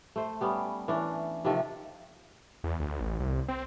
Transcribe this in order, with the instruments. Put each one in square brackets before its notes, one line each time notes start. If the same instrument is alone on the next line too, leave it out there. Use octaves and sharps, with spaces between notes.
[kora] A3 C5
G3 B3 C#4
E3 C#4 D4
C3 D#3 F3 A3
[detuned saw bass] E2
D2
A1
C2
C4